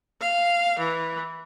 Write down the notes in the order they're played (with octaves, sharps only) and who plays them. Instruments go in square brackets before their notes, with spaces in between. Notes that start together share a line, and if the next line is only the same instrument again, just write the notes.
[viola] F5
E3